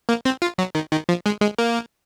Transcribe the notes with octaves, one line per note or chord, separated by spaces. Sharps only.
A#3
C4
F4
F#3
D#3
D#3
F3
G#3
G#3
A#3